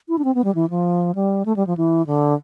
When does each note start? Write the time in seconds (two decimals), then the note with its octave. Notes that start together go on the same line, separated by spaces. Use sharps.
0.08 E4
0.18 D4
0.24 C4
0.35 B3
0.44 G3
0.55 E3
0.70 F3
1.15 G3
1.45 A3
1.56 G3
1.67 F3
1.77 E3
2.07 D3